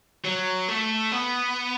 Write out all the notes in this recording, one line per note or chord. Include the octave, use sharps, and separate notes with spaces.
F#3
A3
B3